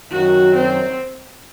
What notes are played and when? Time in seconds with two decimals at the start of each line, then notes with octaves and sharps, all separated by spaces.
0.10 F#2 D#3 F#3 F#4
0.55 C4